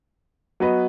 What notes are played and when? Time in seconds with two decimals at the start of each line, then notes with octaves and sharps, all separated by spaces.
0.60 F#3 B3 F#4 B4 D#5